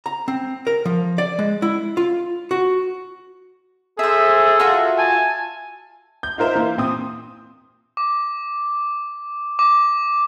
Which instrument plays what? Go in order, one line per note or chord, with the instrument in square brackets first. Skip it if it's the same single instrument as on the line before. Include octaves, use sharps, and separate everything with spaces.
[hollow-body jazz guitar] A#5
C4
A#4
F3
D5
G#3
E4
F4
F#4
[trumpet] G#4 [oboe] A4 [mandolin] C5 E5
[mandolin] F4 F#4 E5
[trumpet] G#5 [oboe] A5
[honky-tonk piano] G6
D#4 F4 A#4 C5 E5
E3 A#3
A#2 C4 D#6
[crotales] D6
D6